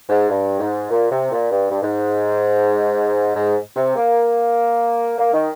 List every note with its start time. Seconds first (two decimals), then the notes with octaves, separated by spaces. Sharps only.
0.09 G#2
0.29 G2
0.60 G#2
0.90 A#2
1.11 C3
1.31 A#2
1.51 G2
1.71 G2
1.82 G#2
3.35 G#2
3.76 C3
3.96 A#3
5.18 A#3
5.33 D#3